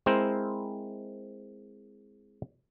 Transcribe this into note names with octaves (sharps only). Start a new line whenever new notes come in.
G#3 C4 E4 A#4 C5